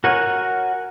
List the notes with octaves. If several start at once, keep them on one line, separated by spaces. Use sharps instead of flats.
F#4 A#4 C#5 F#5 G#5